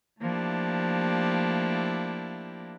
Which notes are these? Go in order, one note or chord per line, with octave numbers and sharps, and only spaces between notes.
F3 A3 A#3 D4 E4 G4